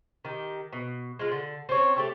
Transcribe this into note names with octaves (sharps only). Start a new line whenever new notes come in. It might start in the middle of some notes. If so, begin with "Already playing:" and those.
D#3 G4
B2
G#3 F4
D3
C4 C#4 C#5
A3 G4 A4